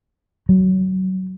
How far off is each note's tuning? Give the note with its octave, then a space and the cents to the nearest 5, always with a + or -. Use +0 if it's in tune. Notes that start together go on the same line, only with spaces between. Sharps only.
F#3 +20